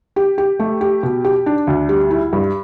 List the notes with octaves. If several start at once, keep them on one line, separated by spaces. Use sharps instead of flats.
G4
G4
A3
G4
B2
G4
D4
D2
G3
E4
G2